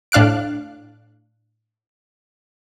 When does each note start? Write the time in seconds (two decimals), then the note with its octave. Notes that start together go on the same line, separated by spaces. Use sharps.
0.12 A2 D4 F5 F#6 D7